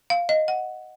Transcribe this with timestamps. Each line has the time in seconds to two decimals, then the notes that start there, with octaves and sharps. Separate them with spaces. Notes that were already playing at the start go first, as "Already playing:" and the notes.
0.10 F5
0.29 D#5
0.48 F#5